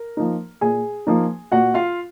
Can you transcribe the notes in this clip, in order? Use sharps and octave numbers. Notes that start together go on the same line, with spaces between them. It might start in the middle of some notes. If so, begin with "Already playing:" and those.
Already playing: A#4
F3 A#3 D#4
A#2 G#4 G#5
F3 A#3 D#4
A#2 F#4 F#5
F4 F5